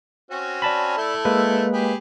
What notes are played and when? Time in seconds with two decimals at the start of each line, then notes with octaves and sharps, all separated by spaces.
0.31 C4 C#4 F#4
0.62 D5 A5 B5
0.97 A3 E4 A4
1.25 G#3 A#3 B4
1.73 G4 G#4 B5